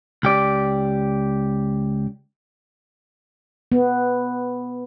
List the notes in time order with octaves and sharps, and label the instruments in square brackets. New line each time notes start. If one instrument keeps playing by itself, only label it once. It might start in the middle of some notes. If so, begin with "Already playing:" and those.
[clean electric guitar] C#2 G4 D5
[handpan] B3